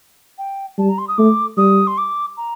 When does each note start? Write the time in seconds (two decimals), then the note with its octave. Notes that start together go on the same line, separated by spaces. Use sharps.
0.38 G5
0.78 G3 A5
0.89 A#5
0.98 C6
1.08 D#6
1.18 A3 D6
1.57 G3 D#6
1.87 C6
1.98 D6
2.37 A#5